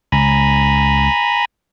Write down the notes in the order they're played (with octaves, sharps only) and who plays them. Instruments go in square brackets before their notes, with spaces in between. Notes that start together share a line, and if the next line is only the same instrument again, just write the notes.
[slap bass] C#2 [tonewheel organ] G#5 A#5 B5